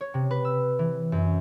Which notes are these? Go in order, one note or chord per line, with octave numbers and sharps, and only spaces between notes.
C#5
C3
B4
E6
E3
F#2